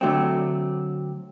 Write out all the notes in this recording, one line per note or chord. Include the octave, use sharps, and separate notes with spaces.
D3 F#3 A3 C4